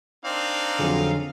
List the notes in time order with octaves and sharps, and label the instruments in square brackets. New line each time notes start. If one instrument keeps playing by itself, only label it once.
[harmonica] C4 D4 D5 [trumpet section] D#4 A#4 F5
[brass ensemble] F2 F#3 [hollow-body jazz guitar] D3 G#4 C5